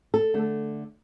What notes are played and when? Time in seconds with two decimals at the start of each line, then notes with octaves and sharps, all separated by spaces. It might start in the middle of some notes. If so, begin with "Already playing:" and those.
0.14 A4
0.34 D3 A3